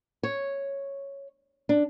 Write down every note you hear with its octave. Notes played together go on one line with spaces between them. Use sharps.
C#5
D4